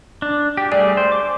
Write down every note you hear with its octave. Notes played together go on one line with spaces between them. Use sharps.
D4
G4
G3 A3 G#4 D5
C5
D6